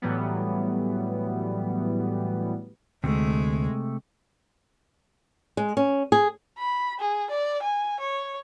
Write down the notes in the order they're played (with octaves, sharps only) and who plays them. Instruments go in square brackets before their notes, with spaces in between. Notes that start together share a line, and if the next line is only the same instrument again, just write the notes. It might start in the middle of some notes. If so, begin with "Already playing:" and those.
[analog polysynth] A2 E3 F#3 G3 B3
[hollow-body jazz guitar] D2 [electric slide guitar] C3 A3 [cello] G#3
[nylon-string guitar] G#3
C#4
G#4
[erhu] B5
G#4
D5
G#5
C#5